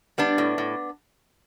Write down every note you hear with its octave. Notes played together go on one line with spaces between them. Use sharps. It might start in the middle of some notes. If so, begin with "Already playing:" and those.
G3 B3 D4
A2
A2